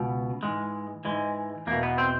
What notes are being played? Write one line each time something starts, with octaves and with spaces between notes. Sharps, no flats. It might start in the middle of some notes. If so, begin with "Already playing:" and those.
Already playing: C#2 B2
G#2 E3 G#3
G#2 E3 G#3
E2 B2 A#3
B3
C4